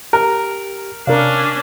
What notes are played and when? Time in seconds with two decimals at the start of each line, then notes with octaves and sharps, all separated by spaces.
0.13 G4 A#4
1.07 C3 C#4 D4 A#4 D5 F5